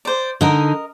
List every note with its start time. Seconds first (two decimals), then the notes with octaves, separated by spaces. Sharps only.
0.05 C5 D5
0.41 D3 D#4 A#4 D#5